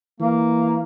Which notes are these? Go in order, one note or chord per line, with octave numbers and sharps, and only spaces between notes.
E3 A#3